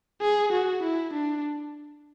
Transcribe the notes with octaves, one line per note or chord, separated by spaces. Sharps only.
G#4
F#4
E4
D4